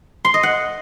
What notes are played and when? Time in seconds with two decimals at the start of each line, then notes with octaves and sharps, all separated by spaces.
0.25 C6
0.34 D#5
0.43 F#5